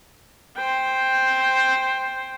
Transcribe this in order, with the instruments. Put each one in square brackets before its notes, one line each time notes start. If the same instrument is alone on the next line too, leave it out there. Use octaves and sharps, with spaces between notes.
[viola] C5 G5